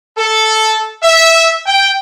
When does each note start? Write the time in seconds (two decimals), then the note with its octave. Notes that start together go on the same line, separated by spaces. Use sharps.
0.17 A4
1.03 E5
1.66 G5